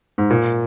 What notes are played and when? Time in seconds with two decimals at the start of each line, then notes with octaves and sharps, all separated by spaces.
0.18 G#2
0.30 A#2